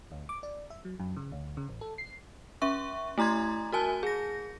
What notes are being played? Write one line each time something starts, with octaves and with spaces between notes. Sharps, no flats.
D2
D6
D5
E5
F#3
F#2
C#3
D2
C#3
A1
A4
C7
C#4 E5 C#6
A3 E4 A#5 C6 G#6
F#4 A#4 G#5 A5
G#4 A#6